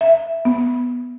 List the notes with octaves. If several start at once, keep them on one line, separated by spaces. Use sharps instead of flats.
E5
B3